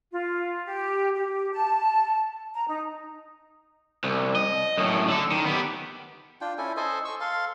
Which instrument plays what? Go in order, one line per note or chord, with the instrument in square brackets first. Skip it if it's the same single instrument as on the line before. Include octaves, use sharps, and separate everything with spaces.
[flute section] F4
G4
G4
A5
A#5
D#4
[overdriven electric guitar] C2
D#5
F#2 A2
D3 A4
D#3
B3 G4
[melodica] D4 F4 G5
C#4 E4 A4 G#5
A4 C5 D#5 G#5
C#6 E6
A4 F5 C6